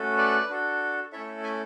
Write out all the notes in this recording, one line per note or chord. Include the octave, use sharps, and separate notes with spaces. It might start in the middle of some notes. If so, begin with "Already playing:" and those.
Already playing: A3 C#4 F#4 A4
B4 D5
D4 F#4 A4
A3 C#4 E4 A4 C#5 E5
E5 G#5